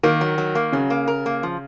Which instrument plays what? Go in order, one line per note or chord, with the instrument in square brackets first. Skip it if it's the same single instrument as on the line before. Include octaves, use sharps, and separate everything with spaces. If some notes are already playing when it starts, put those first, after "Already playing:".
[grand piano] D#3 [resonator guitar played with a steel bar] A#3
[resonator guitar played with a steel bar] F#3
F#3
A#3
[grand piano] C#3 [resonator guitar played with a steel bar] F#3
[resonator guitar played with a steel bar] A#3
A#4
A#3
F3